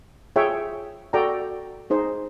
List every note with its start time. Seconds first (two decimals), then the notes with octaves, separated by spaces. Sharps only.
0.36 F4 G#4 C#5 E5 G5
1.13 F#4 A4 D5 G5 A#5
1.90 D#4 G#4 C5